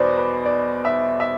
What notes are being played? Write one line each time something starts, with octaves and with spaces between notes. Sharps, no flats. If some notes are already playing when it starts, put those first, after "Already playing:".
Already playing: E2 B2 B4 C5 D5
B4
D5
E5
E5